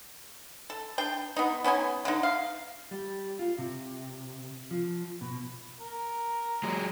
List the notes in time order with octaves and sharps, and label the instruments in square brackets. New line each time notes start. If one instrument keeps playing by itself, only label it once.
[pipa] A4
D4 G5
B3 D#4
B3 C#4 D#4 G#5
D3 D#4
F5
[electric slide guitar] G3
F4
C3
F3
B2
[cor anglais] A#4
[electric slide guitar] F#3 G#3